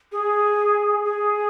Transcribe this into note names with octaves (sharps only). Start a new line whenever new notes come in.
G#4
G#4